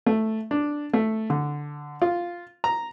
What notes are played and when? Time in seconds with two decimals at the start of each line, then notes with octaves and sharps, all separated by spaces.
0.06 A3
0.51 D4
0.93 A3
1.30 D3
2.02 F4
2.64 A#5